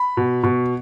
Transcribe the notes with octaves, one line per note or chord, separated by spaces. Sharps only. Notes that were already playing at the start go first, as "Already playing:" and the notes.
Already playing: B5
B2
B2